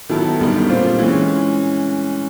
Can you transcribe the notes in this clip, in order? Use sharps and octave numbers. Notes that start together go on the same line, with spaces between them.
D#3 F#3 B3 E4 A4
F#2 D3 G3 B3 D#4
A#2 G3 C4 F4
E3 G#3 C#4